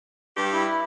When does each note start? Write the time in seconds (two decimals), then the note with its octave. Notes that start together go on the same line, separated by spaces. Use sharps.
0.37 G2 G4
0.53 E4